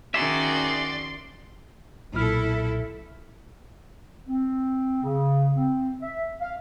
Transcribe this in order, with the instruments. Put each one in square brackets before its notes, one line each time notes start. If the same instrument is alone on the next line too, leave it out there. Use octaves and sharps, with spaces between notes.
[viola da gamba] D#3 C#4 F#4 [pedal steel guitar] D#4 G#4 E5 [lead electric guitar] D5 [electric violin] C6
[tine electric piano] B1 A#2 F6 [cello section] E4 A4
[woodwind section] C4
C#3
C4
E5
F5